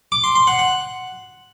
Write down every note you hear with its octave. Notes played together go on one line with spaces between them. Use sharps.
D6
C6
C6
F#5
F#5